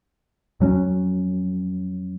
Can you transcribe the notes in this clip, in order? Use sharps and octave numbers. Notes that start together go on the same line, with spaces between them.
F2 F#3 C#4